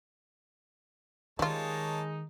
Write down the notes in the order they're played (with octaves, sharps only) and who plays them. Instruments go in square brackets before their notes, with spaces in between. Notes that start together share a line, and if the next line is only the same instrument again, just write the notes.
[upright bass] D#3 [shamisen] G3 F4 [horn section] G#3 D#4 [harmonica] A#3 C#5 A5